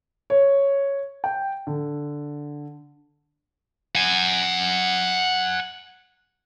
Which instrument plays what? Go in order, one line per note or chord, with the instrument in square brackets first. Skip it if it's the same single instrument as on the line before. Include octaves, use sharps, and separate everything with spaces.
[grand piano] C#5
G5
D3
[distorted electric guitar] F#5 G#5